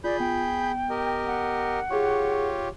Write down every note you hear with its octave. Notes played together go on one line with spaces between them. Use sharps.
F4 G#4 D5 B5 G6
B3 G5
G4 A#4 D#5
F#5
F4 G4 G#4 C#5 C#6